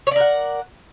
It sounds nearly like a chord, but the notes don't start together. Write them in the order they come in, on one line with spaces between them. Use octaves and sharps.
C#5 D5 A#4 F#5